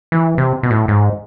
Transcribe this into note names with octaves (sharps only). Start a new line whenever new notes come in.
E3
C3
B2
A2
G#2